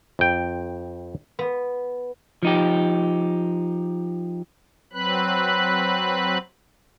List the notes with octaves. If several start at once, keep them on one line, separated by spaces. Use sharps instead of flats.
F2 G5
B3
F3 D#4 G4
F#3 C4 B4 B5 F#6